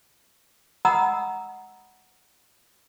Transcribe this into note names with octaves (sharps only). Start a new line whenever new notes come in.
D#5 F#5 A#5 B5 D#6 E6